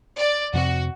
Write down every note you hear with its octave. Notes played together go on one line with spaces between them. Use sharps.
D5
F2 C3 C4 F#4